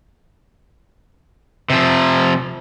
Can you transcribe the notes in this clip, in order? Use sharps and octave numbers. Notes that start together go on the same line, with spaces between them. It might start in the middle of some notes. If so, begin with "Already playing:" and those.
C3 F3